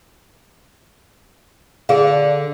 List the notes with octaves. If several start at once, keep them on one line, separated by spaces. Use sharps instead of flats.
D3 G#4 F5